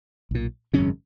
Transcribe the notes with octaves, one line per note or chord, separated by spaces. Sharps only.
B1 A#2
G#1 F#2 C#3 C#4